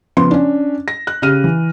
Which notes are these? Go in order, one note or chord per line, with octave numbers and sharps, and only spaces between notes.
C#3 F3 B3 C6
C#4 D4
A#6
F#6
C#3 G4 F6 D#7
E3